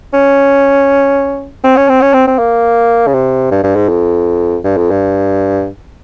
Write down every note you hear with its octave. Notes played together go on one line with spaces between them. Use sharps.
C#4
C4
C#4
C4
C#4
C4
C4
A#3
C#3
C3
G2
G2
G#2
F2
G2
F2
G2